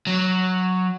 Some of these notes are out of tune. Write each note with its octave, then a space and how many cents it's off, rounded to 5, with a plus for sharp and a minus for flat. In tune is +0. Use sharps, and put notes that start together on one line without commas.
F#3 -5